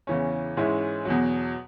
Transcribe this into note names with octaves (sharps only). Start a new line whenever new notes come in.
E2 C#3 E3 C#4
G#2 E3 G#3 C#4 E4
E2 B2 F#3